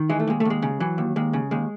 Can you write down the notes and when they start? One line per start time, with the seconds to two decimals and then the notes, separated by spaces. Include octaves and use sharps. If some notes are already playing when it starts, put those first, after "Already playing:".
Already playing: D#3
0.09 E3 G#3
0.20 A3
0.27 D#2 G#3
0.40 A3
0.45 D#2 G#3
0.62 C#3
0.80 E3 F#3
0.98 D#2
1.16 D#2 G#3
1.33 C#3
1.51 D#2 G#3